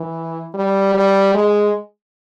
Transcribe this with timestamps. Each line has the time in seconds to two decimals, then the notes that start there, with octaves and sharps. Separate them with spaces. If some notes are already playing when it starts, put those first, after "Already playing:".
Already playing: E3
0.54 G3
0.94 G3
1.34 G#3